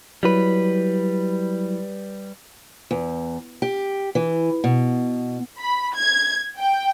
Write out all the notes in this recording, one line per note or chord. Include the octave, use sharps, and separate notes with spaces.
F#3 G3 E4 B4
E2
G4
E3
B2
B5
G#6
G5